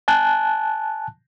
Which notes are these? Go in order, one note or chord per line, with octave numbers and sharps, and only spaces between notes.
G#5 A5 F#6